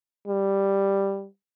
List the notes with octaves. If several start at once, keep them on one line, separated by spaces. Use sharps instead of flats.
G3